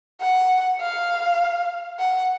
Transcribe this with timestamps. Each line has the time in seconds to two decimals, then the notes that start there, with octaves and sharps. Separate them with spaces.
0.21 F#5
0.81 F5
1.99 F#5